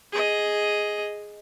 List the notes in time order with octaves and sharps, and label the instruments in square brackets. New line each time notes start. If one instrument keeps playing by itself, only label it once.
[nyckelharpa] G#4 D#5